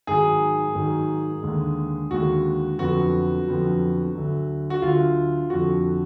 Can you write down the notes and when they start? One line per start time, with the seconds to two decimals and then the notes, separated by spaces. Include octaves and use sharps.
0.07 G#2 D#3 F#3 G#4
0.75 G#2 D#3 F#3
1.43 D#2 D3 G#3
2.11 D#2 D3 G#3 F#4
2.79 F2 D3 F#3 B3 F#4
3.46 F2 D3 F#3 B3
4.14 D2 D3 F#3
4.70 F#4
4.82 D2 D3 F#3 F4
5.50 F2 D3 F3 F#4